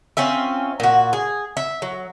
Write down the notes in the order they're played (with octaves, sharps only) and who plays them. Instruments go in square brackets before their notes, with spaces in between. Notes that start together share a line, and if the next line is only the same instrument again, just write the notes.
[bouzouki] C4 C#4 F4 E5
A#2 F#4
G#4
E5
F#3